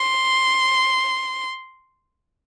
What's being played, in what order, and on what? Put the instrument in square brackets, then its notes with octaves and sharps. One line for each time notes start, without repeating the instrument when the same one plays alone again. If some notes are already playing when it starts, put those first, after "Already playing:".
Already playing: [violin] C6